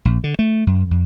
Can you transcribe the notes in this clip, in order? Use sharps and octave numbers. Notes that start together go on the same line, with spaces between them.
A#1
D3
A3
F#2
F2